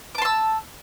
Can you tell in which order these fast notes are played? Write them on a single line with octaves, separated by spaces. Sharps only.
D6 A5 C6 E6